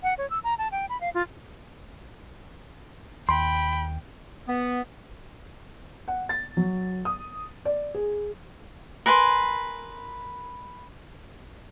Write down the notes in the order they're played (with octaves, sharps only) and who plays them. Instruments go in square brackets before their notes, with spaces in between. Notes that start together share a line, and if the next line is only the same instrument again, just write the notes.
[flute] F#5
C#5
E6
A#5
A5
G5
B5
F5
F4
[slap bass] D#2 [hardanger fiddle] G5 [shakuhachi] B5 [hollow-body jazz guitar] C6
[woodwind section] B3
[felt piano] F#5
A6
F#3
D#6
D5
G#4
[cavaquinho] A#4 B4 G#5 C6